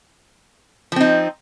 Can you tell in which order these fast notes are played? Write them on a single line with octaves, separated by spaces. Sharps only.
F3 C4 D#4